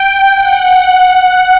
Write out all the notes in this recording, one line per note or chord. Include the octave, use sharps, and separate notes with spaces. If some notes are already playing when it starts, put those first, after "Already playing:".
Already playing: G5
F#5